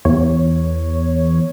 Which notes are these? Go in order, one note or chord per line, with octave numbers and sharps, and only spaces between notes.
E2 C#5